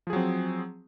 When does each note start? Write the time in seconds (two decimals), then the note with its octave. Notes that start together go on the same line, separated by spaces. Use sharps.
0.07 F3
0.10 G#4
0.13 F#3
0.16 C4